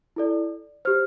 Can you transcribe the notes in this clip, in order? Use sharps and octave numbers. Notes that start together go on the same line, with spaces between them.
E4 A4 D5
G4 C5 F6